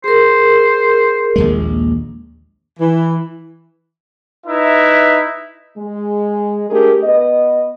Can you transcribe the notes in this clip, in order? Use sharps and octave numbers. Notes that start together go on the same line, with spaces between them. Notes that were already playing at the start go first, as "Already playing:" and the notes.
G#4 A#4 C5
A#1 D#2 G#3
E3
D#4 E4 B4 E5
G#3
A3 D4 G4 G#4 A#4
B3 B4 D#5